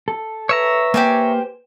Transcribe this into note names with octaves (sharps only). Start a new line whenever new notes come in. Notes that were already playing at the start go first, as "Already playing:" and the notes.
A4
B4 C#5 E5 A#5
A#3 G4 C5 G#5